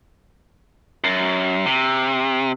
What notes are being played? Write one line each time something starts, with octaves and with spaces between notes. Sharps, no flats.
F#2
C3